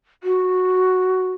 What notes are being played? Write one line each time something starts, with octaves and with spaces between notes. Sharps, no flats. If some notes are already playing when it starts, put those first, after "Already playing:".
F#4